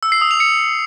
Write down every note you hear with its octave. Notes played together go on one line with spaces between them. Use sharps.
E6
C7
D#6
F7
C#7